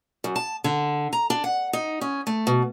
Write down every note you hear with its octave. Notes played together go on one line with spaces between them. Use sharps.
F#2
A5
D3
A#5
D4
F#5
D#4
C#4
A3
B2